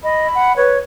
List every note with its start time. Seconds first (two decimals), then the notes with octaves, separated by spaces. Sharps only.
0.03 D#5 B5
0.35 F#5
0.56 B4 C#5